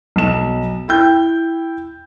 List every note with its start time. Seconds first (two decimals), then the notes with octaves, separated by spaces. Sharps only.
0.16 B1 E7
0.88 E4 G5 G6